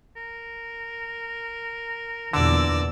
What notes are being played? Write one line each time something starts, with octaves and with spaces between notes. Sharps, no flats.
A#4
E2 A#2 D3 D5 E6